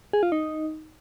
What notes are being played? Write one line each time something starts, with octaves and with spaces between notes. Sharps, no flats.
G#4
F4
D#4